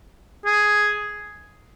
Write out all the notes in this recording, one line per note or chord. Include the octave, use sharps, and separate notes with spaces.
G#4